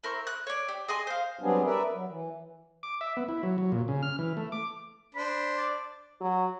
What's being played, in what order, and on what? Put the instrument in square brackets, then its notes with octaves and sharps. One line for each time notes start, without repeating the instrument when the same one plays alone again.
[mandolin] E4 A#4 C5 C#6
F#6
C#5 D5
G4
G#4 D#5 G#5 C6
C5 F5
[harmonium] F#3 G3 B3 C4 D4 G#4
A#4 B4 D5 E5
F#3
E3
[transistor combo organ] D6
E5
B3
E4
F#3
F#3
A#2
C#3
F6
E3
A3
D6
[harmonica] D4 C5 [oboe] B5
[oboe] D5
[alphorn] F#3